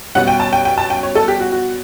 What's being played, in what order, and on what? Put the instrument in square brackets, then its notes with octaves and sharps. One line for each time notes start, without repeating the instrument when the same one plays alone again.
[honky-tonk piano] B2 G3 C#4 F#5
G5
A5
G5
G5
A5
G5
C#5
A4
G4
F#4
F#4